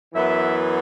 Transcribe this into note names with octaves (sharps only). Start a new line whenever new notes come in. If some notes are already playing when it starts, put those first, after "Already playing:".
F#2 E3 B3 E5